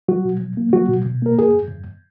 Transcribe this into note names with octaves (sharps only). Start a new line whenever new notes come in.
F#3 F#4
B2
F#3
A#3
F#3 F#4
B2
B2
A#3 A#4
F#2 G#4
F#2
F#2